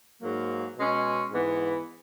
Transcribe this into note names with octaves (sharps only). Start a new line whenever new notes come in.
G#2 F#3 A#3
B2 G#3 C#4
G#2 E3 B3